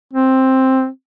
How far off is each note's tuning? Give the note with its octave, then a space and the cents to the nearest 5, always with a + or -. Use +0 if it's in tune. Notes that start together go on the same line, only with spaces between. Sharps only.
C4 +5